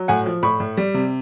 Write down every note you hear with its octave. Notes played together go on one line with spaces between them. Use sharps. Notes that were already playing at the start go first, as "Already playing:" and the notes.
Already playing: F#3
A2 F#5 G#5
F3
A2 B5 C#6
A2
G3
C3